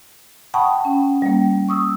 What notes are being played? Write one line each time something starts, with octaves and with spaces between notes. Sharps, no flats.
F#5 G5 A5 B5 C#6 D#6
C#4
G3 A#3
C#6 D#6 E6